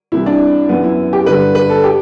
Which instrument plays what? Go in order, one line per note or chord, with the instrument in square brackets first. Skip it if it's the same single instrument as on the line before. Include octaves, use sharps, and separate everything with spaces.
[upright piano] C2 C3 E3 E4
D4
F#2 E3 B3
E4
G4
G2 D3 B4
B4
A4
G4